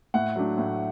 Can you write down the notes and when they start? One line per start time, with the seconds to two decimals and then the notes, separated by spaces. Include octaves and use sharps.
0.14 A2 F#5
0.36 F#3 A3 D4
0.58 A2